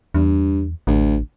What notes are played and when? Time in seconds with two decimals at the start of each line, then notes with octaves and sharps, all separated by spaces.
0.14 E2 G2
0.87 A1 D2